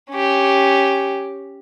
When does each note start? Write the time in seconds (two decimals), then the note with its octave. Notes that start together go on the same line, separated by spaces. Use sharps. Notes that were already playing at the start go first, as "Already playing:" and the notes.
0.12 C#4 G4